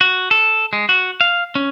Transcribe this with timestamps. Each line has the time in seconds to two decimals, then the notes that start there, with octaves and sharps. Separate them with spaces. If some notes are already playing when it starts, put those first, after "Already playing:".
0.01 F#4
0.31 A4
0.73 G#3
0.89 F#4
1.21 F5
1.55 C#4